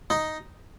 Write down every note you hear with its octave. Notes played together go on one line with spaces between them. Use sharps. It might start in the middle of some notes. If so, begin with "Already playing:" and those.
D#4